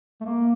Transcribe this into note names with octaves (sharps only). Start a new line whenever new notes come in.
A3
A#3